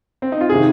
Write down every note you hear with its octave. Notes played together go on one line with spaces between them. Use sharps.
C4
D#4
F4
C3 D#3 G#4